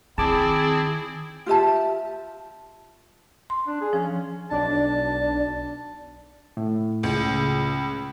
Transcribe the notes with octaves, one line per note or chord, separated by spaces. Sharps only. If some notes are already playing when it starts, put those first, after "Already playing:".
D#3 C4 E4 G#4 D5 A5 D6
F4 G4 E5 A5
C6
D4
G#4
F3 C#4
B1 D4 A5
A2
C#2